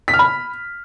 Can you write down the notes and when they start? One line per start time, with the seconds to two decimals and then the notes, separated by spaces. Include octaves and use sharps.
0.08 B6
0.14 F6
0.19 B5